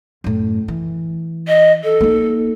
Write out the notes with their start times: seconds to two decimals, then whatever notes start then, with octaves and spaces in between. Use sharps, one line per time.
0.24 F#2 A2
0.68 E3
1.48 D#5
1.84 A4
2.01 A#3 D#4